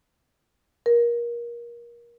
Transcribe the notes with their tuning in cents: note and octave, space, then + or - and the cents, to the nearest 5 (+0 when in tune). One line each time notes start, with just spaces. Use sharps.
A#4 +25